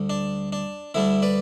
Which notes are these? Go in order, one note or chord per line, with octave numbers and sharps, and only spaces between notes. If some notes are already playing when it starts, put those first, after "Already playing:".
Already playing: D2 D3 G3
D4
D4
D2 D3 G3 D4 E4
B4 D5